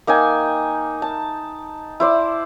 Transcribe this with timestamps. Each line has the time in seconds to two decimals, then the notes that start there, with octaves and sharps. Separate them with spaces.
0.07 A#3 D#4 G5 G#5
1.02 A5
2.00 E4 C5 D5